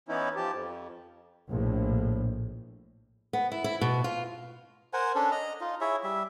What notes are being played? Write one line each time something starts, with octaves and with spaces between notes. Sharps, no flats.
E3 B3 C#4 D#4 E4
F3 G4 A5
F2
A#1 A2
B3
E4
E4
B2
F4
A#4 C5 F#5 G#5
C#4 D4 A4
D#5 A#5
D#4 F4
E4 G#4 C#5 E5
G3 E5